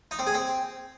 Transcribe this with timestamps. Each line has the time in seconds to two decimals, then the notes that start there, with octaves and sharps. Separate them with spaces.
0.11 D#4
0.19 C4
0.27 G#4
0.34 C4